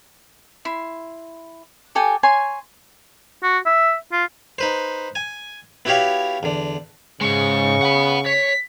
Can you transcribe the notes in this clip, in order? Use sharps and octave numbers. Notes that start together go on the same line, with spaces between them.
E4 C6
G4 A4 G5 G#5
C#5 G#5 C6
F#4
E5
F4
D#4 B4 C5
G#5
B3 E4 F#4 G4 C#5 F5
E2 D3
G#2 C#3 G#3 C#6
F#5 B5
C#5 B6